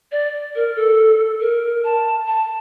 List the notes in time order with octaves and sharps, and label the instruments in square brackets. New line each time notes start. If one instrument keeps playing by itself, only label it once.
[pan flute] D5
A#4
A4
A#4
A5
A5